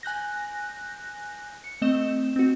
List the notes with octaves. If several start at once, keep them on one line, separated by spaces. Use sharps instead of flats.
G#5 F#6 G6 A#6
C#7
A3 C4 D#5 E7
C4 F#4